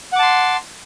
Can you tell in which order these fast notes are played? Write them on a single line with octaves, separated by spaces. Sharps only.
F#5 D6 A5 C6